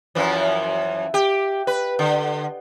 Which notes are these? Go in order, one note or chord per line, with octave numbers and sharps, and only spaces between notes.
F#2 E3 F3
G4
B4
D3